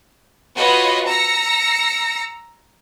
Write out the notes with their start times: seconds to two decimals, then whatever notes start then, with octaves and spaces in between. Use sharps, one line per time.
0.56 F4 F#4 B4 C#5 D#5 B5
1.05 A#5 E6 A#6 C#7